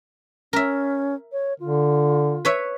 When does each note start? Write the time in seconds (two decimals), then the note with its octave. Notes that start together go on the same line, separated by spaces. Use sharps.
0.53 C#4 A#4 E5
1.32 C#5
1.60 D3 F4
2.45 B4 C#5 E5